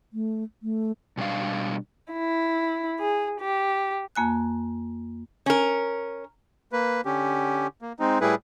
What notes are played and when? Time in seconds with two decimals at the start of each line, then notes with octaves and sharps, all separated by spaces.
0.13 A3
0.63 A3
1.17 B2 G3 D4 F5
2.14 E4
3.00 G#4
3.41 G4
4.15 F2 A#3 G#5 F#6
5.46 C#4 A#4
6.72 A#3 B4
7.06 D3 C#4 G4
7.82 A#3
8.00 G#3 C4 D#4
8.21 A2 G3 E4 G#4 B4